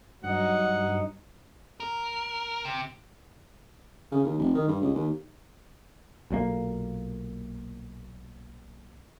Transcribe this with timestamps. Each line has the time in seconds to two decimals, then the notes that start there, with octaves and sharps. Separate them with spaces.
0.24 G2 F#3 D#4 F#5
1.80 A#4
2.65 C3
4.11 C#3
4.24 D#2
4.39 F1
4.55 D#3
4.68 G2
4.81 C#2
4.95 D#2
6.31 B1 A#2 F3 A#3